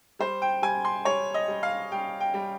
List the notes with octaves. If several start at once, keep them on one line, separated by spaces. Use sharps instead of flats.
G3 C5
G5
G3 G#5
C6
G3 C#5
D#5
G3
F5
G3 G5
G5
G3